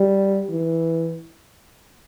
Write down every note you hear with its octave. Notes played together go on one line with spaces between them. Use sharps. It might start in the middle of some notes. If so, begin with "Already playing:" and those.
Already playing: G3
E3